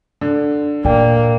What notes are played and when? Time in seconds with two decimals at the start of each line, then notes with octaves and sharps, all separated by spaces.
0.21 D3
0.84 A#2 A#3 D5 G5